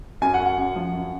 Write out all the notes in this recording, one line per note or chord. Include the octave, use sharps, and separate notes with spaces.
F#2 G#5
F#5
F#2
F#5
F#2
F3
F#2